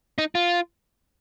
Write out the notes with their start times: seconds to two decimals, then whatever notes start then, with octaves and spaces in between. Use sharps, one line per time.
0.18 D#4
0.35 F4